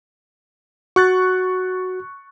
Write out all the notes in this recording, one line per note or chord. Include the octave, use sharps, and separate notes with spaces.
F#4 C#6 F#6 A6